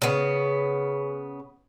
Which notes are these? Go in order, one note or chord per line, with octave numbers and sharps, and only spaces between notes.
C#3 B3